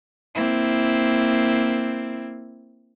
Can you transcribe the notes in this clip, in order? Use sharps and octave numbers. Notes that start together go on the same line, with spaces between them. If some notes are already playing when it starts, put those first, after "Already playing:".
A#3 C4 E4